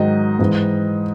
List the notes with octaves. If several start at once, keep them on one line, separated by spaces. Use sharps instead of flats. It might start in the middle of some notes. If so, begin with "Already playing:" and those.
Already playing: G#2 D#3 F#3 D#5
G#2 E3